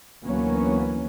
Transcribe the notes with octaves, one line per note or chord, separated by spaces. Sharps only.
D2 E3 F#3 A#3 B3 C#4